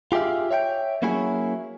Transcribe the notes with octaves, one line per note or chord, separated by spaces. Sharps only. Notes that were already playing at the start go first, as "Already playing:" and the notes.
F4 G4 G#4 E5 F5
C#5 E5 F#5 G5
F#3 A#3 C#4 E4 F#4 G#4